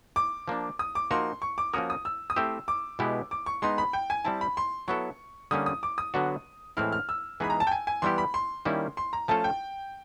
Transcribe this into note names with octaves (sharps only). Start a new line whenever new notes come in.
D6
F3 A#3 D4
D#6
D6
F3 A#3 D#4 F#4 A#4 C6
C#6
D6
F3 A#3 C#4 F#4 A#4 D#6
D#6
E6
D#6
A3 C4 E4 G4 C5 E6
D6
B2 G#3 B3 E4 G4
D6
C#6
G#3 B3 D#4 C6
B5
G5
G#5
G3 C4 E4 A5
B5
C6
F#3 B3 E4 A4 C#6
D3 G3 A#3 C#4 D#6
D#6
D6
D#6
D3 F#3 B3 D4 F#4
A2 E3 G#3 C4 E4 F6
F6
E6
E3 G#3 B3 D#4 G#4 B5
A#5
A5
G5
G#5
G#5
E3 G3 B3 E4 G4 C6
B5
C6
D#3 G3 A#3 C#4 E4
C6
A#5
F3 A3 C#4 F4 A4 A5
G5